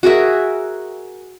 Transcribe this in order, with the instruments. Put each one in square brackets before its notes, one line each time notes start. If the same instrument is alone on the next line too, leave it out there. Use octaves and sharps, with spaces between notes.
[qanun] F#4 G#4 A#4 E5